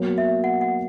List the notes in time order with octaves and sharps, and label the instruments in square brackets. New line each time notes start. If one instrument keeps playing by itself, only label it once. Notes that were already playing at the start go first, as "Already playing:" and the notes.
Already playing: [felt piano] B2 F#3 A#3
[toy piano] E5
F#5
F#5